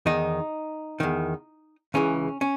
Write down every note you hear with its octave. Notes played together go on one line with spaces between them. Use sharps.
E2 D#3 D#4
E2 D#3
C#2 C#3 E3 C#4
C#4